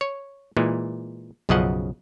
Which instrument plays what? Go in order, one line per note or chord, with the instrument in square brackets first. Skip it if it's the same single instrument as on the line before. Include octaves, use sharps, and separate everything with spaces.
[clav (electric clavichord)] C#5
A#2 E3 G#3
B1 F#2 C#3 F3 D#5 F#5